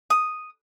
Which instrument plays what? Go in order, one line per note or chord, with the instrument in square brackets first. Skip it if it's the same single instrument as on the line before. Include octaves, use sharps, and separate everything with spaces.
[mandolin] D#6